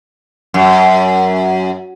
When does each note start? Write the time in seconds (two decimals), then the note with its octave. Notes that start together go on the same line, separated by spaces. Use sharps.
0.54 F#2